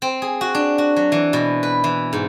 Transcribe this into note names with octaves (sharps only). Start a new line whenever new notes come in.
C4
G#4
F#4
D4
F#4
F#3
E3
B2
B4
E3
G#2